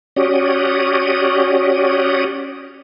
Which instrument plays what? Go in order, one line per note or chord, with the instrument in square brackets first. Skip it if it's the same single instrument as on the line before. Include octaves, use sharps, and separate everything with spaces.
[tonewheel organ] C#4 F#4 G4 C#5 D5 D#6